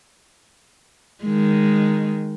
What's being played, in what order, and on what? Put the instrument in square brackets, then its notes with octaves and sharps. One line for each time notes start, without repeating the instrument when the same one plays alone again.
[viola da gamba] D#3 G#3